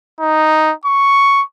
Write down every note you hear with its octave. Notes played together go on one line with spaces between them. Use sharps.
D#4
C#6